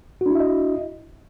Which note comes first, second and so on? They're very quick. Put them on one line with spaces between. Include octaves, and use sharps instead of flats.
F#4 D4 E4 E5 D#5